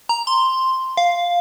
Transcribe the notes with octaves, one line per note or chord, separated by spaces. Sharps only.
A#5
C6
F5